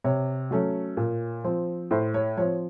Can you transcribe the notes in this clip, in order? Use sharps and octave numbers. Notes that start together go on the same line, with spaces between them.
C3 C#5
F#3 A3 C#4
A#2
F3 C4
A2 C5
C#5
F3 C4 C#5